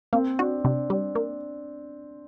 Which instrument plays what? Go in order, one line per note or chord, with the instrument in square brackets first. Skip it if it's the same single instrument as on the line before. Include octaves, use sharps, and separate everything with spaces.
[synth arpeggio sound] A#3 [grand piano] C4
[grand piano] D4 [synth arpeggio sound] F#4
[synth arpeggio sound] C3 [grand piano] D4
[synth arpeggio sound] G3
A#3